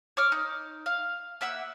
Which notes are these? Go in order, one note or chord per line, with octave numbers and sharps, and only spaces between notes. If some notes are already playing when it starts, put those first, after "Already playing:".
C#5 D6 F6
D#4
F5
A#3 E5 F#5 E6